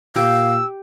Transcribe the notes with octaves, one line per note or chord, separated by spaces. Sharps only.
A#2 G4 F5 E6